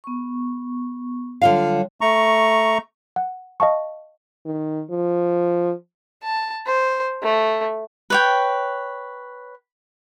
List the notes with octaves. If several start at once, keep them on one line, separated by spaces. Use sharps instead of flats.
B3 C#6
D3 F#3 G3 F4 C#5 F5
A3 A#5 C#6
F#5
D#5 F5 A5 C#6
D#3
F3
A5
C5
A3
B4 C#5 G5